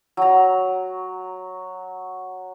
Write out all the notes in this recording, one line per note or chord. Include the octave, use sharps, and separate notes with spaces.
F#3 A#5